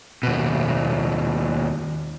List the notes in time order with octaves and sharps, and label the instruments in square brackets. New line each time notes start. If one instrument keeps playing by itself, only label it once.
[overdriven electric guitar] D#2 B2